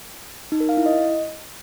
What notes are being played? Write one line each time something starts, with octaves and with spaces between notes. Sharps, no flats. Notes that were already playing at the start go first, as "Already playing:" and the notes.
D#4
A#4
F5
E4
D#5